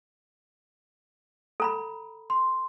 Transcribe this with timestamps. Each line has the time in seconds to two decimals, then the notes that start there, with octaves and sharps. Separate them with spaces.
1.60 A4 A#5 B5
2.30 C6